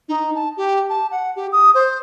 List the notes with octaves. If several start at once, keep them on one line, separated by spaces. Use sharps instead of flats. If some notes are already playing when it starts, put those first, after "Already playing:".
D#4
A5
G4
A5
F#5
G4
D#6
C5